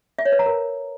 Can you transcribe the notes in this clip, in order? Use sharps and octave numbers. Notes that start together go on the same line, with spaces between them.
E5
C#5
B4
A#5
A#4